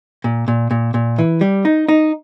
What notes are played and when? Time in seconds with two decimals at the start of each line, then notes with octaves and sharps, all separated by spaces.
0.24 A#2
0.48 A#2
0.71 A#2
0.94 A#2
1.19 E3
1.41 G3
1.65 D#4
1.88 D#4